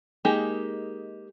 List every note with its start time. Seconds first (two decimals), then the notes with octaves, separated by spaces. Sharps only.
0.25 G#3 A#3 D#4 G4 G#4